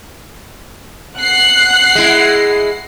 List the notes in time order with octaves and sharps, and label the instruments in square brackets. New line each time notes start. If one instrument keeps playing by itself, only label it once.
[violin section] F#5 C7 [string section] F#6
[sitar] G#3 E4